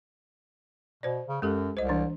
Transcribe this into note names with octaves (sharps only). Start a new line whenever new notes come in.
B2 C5 D5
C#3
F#2 G#3 G4 A4
C2 C5 D#5
E3 D4